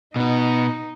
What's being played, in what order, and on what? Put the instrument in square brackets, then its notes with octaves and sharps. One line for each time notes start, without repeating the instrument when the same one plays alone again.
[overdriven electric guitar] B2 B3 [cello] D#4